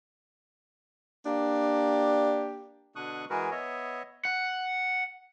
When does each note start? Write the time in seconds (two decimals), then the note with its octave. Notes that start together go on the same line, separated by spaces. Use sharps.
1.26 A#3 D4 G4
2.96 B2 D3 D4 C#6 D#6 F#6
3.30 E3 G#3 F#4 G#4 A#4 B4
3.51 B3 C#5 D#5 E5
4.25 F#5